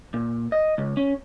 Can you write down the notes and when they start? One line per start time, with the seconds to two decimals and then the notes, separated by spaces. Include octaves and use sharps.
0.14 A#2
0.52 D#5
0.78 C#2
0.97 C#4